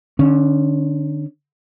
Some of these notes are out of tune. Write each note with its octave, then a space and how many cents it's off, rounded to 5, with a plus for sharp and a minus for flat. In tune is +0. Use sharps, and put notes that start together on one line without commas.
D3 +30 C#4 +0